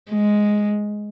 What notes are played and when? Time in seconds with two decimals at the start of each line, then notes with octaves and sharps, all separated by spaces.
0.10 G#3